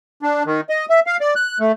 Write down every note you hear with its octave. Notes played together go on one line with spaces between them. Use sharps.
D4
D#3
D#5
E5
F5
D5
F#6
A3